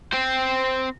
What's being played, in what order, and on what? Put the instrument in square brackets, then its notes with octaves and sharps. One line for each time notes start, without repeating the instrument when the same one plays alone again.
[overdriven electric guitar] C4 C5